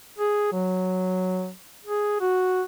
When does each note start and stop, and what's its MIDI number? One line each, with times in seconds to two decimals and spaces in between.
0.18 0.47 68
0.52 1.50 54
1.85 2.16 68
2.21 2.62 66